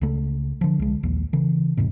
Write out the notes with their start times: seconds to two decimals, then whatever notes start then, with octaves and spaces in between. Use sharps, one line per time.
0.01 C#2 C#3 A3
0.61 D3 F3
0.79 C2 G#3
1.03 A#1 D#2
1.33 C#3 E3
1.77 E1 E2 G#2 C3